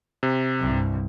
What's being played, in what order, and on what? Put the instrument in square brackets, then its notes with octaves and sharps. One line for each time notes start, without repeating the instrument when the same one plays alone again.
[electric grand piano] C3
[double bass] C2 G2